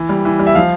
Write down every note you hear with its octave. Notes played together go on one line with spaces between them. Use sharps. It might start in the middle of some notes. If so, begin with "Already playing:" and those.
Already playing: E3
G3
E3
G3
E5
F3 F5